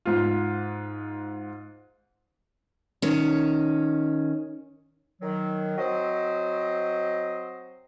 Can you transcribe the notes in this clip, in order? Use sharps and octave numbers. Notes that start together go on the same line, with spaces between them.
G#2 F4
D#3 C#4
D#3 F#3
F#3 C4 C5 D#5